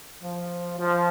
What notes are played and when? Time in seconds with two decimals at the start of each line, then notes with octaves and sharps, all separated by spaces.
0.23 F3
0.78 F3